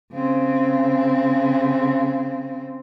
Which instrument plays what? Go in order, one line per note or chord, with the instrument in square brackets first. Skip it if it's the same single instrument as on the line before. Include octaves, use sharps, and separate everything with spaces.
[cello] C#3 C4